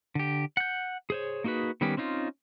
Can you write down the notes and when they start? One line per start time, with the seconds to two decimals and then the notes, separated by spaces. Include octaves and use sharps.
0.15 D3 G4
0.57 F#5 G6
1.10 G#4 C5 C#5
1.44 A#3 D#4 F#4 G#4 B4
1.81 D#3 G3 B3 C#4 G4
1.97 C4 C#4 D#4 F4